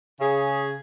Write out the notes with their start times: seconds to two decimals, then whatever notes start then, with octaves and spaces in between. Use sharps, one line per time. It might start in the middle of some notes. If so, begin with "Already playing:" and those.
0.21 C#3 G#4